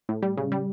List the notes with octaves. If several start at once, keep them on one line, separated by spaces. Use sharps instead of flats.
A2
G3
C#3
G3